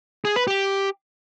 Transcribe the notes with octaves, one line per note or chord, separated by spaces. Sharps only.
G#4
B4
G4